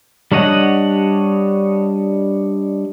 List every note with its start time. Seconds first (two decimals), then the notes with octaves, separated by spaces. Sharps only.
0.32 G3 D4 C#5 D#5 F#5